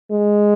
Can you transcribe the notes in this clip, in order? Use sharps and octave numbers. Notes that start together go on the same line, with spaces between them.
G#3